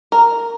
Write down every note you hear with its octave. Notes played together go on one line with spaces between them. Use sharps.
A#4